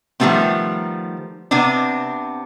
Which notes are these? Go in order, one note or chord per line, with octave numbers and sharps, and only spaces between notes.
D#3 F3 G3 A3 B3 C4
C3 B3 C4 D4